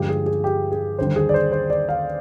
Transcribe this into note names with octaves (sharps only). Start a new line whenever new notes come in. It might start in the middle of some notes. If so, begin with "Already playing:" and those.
Already playing: G2 D3 F3 G#3 G4
G#4
G#4
G4
G#4
D#2 D3 G3 C5
G#4
D5
C5
C5
D5
F5